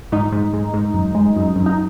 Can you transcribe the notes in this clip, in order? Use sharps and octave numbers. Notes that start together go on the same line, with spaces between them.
G#2 D#4
G#2
G#2
G#2
F#2
G#3
F#2
F#2
D#4